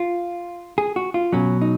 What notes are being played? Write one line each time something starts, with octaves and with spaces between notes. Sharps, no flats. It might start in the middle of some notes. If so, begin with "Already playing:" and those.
Already playing: F4
G#4
F#4
F4
B2 F#3 C#4
D#4